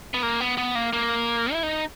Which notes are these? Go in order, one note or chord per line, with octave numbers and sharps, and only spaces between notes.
B3
A#3
B3
B3
A#3
A#3
E4
D#4